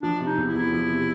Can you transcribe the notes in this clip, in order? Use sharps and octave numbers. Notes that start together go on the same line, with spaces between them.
F3 D4
C3
D#4
E2
E4
E2
F3
C3